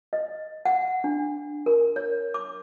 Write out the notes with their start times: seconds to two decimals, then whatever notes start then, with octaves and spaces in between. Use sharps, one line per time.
0.13 D#5
0.65 F#5
1.04 D4
1.66 A#4
1.96 C#5
2.34 D6